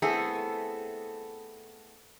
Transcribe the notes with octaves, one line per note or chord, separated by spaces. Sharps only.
A3 B3 C4 E4 G#4 A4